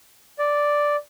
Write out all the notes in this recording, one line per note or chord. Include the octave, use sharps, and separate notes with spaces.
D5